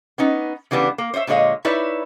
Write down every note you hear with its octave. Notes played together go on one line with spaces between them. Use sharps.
B3 C#4 D#4
C#3 E3 G3 B3 D4
A#3
C5 C#5 D#5 E5
A#2 D3 G#3 C#5 D#5 F5
D#4 E4 B4 C#5 D5 E5